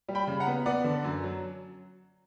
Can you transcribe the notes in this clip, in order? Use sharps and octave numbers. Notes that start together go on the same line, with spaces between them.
G3
G5 B5
C#3
F#5 A#5
B3
B3 D5 F#5
D3
F#2
F#3